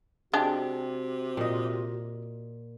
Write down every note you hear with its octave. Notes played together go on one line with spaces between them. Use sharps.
C3 G#3 D4 F#4 G4
A#2 D#5